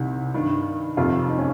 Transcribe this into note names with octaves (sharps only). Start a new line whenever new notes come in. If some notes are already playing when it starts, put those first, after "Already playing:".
Already playing: C2 C3 D#3
G2 D#3
F2 C3 D#3 F4
D#4
C#4